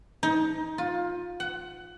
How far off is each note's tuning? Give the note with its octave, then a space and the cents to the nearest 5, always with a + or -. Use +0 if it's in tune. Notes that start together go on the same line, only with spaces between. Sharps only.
D#4 +25
F4 +20
F#5 +20